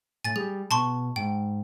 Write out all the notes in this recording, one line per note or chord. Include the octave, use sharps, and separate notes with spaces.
A2 G#5 A6
G3 G#4
B2 A5 C6 C#6
G#2 G5